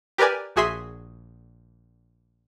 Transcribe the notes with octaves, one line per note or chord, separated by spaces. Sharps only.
G4 A#4 B4 D5 G#5
A#1 F#4 G#4 E5 C6 B6